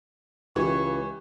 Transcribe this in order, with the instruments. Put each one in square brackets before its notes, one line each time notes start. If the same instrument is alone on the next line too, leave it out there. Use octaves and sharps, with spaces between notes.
[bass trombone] C#2 [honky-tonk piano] E3 [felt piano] G4 [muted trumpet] C#6